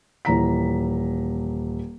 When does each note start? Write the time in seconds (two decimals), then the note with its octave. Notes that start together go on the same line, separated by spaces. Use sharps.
0.25 D#1 E3 A#5 B6